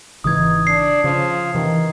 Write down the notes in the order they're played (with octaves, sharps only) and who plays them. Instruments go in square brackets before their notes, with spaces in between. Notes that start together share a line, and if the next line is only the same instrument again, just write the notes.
[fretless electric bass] G#1 C#3 E3 [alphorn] D#4 [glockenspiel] D#6 G#6
[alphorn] D4 [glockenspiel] C7
[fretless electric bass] C#3 [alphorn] F3
[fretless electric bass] C3 E3 [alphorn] D#3